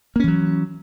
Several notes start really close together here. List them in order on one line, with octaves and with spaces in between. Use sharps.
A#3 C#4 E3 F#3